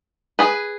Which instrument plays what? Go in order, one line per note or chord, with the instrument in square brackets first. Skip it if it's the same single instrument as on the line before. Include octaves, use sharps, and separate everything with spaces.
[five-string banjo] G#4 B4